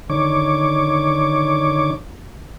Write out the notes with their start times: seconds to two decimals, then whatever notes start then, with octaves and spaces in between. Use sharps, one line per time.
0.10 D3 D#3 C#5 D6